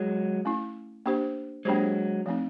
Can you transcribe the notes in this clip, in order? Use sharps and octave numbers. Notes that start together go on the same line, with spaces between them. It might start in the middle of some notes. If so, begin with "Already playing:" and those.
Already playing: F#3 G#3
A3 C#4 E4
A#3 D4 G4 C5
F#3 G#3 A#3 D4 G4 C5
F3 A3 C4 D#4